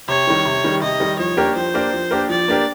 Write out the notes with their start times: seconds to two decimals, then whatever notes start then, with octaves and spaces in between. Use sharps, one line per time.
0.08 C3 C#5
0.27 D#3 G3
0.45 C3
0.64 D#3 G3
0.82 C3 D#5
1.00 D#3 G3
1.19 F3 C#5
1.37 A#3 D4 G4 A#4
1.56 F3 C5
1.74 A#3 D4 G4 A#4
1.93 F3
2.11 A#3 D4 G4 A#4
2.29 F3 D5
2.48 A#3 D4 G4 A#4